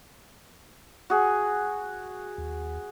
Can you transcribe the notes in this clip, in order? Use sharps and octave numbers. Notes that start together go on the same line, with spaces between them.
F#4 G#4
D#2